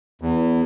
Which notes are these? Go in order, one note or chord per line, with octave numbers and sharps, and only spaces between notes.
E2